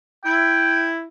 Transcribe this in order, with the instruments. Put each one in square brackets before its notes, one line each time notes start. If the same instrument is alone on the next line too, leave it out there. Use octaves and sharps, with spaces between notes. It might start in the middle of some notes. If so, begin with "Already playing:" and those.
[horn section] E4 [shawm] G5